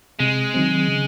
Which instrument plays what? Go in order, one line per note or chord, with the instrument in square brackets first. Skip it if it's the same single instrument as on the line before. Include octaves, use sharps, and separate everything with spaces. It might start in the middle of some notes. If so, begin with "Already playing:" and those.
[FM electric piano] C3 [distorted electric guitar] G#3
[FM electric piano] D#3 F#3 C4
C#3